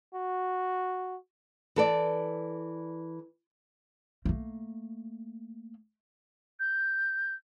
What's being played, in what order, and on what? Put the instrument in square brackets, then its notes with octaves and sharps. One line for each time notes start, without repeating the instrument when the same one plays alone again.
[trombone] F#4
[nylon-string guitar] E3 A4 D5
[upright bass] A3 A#3
[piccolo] G6